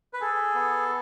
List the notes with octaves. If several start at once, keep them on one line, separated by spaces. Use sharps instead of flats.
B4
G#4 A4
B3